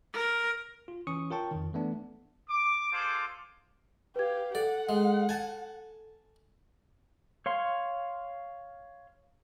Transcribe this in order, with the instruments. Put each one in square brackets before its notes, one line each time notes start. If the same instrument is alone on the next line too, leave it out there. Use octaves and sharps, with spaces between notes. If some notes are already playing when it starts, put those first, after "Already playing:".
[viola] A#4
[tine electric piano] F4
E3 C#4 C#6 D#6 C#7
F4 A#4 C#5 G5 A5 C#6
F2 D#3
E3 A3 B3 D4
[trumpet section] D6
F4 G#4 A4 C5 D6
[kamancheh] G4 F5 [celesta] B4 G#6
[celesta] A4 [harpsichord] D5 [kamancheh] F#5
[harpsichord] G#3
G#5 A5
[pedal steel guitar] C#5 F5 C6